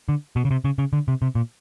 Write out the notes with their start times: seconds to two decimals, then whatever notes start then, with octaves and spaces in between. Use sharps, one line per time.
0.09 D3
0.36 B2
0.45 C#3
0.51 C3
0.64 C#3
0.78 C#3
0.93 D3
1.08 C3
1.22 C3
1.35 A#2